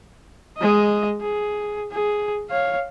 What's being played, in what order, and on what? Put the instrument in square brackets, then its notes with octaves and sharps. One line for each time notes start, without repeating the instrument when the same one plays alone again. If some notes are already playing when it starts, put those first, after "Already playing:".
[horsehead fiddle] G#3 D#5
G#4
G#4
C#5 F5